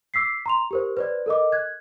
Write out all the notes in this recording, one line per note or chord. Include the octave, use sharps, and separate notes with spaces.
D6 E6 B6 C7
A#5 C6 F7
G4 A#4 C5
B4 C5 D5
A4 A#4 D#5 D6
F#6 G#6